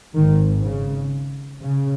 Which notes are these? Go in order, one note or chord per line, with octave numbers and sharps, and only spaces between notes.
G#1 G#2 D#3
C#3
C#3